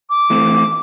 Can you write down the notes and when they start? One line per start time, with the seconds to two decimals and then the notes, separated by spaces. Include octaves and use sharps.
0.10 D6
0.30 E3 A3 C4